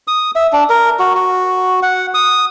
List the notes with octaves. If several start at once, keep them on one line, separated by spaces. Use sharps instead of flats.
D#6
E5
D4
A#4
F#4
F#4
F#5
D#6